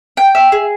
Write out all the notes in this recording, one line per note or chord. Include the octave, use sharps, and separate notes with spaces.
G5
E5
G#4